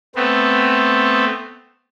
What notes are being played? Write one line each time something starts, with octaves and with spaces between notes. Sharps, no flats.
A3 B3 C4